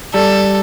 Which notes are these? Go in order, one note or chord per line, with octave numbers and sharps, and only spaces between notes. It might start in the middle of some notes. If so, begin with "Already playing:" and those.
G3 A4